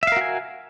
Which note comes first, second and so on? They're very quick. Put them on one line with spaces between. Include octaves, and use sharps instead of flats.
E5 F5 A#4 F#4 G#5